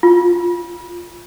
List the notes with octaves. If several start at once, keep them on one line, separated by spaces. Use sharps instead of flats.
F4